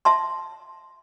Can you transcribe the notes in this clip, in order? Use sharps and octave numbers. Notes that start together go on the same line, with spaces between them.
E5 A5 C6